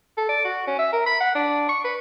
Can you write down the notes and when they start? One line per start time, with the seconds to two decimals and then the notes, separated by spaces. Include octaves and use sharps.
0.17 A4
0.29 D5
0.44 F#4
0.68 C#4
0.79 E5
0.93 A#4
1.06 B5
1.20 F#5
1.35 D4
1.69 C#6
1.84 B4